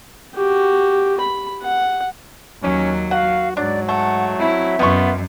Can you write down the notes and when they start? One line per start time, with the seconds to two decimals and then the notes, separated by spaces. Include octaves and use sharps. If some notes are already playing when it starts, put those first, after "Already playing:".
0.35 F#4 G4
1.20 B5
1.62 F#5
2.63 D#2 F#3 C#4
3.11 F#4 F5 F#5
3.57 G#2 F#3 D4 D5
3.89 A3 F#5
4.39 C4 E4 E5
4.79 F#2 B2 B3 F4 C#6